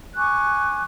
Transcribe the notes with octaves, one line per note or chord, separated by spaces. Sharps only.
G#5 C#6 D6 F#6